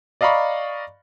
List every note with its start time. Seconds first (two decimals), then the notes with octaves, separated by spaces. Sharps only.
0.21 D5 D#5 F5 A#5 B5 C#6